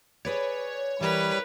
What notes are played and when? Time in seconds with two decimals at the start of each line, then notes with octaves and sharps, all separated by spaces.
0.25 G#4 B4 C#5 D5
1.01 E3 G3 A#4 B4